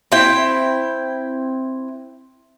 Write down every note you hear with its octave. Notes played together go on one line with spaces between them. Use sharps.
C4 E4 G5